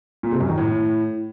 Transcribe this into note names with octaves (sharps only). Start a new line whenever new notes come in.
A#2
C3
F#2
D#3
A2